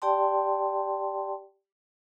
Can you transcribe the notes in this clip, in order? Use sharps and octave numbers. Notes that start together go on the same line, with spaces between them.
G4 D5 G5 A5 C6